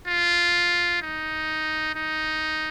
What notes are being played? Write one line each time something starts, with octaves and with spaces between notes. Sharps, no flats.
F4
D#4
D#4